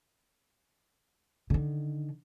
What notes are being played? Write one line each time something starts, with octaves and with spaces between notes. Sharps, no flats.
D3 D#3